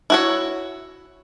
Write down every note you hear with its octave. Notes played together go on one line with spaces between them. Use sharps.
E4 F#4 C#5